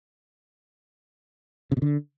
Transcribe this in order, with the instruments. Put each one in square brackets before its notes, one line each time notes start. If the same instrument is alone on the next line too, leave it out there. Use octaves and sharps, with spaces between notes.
[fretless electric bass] C#3
B2
D3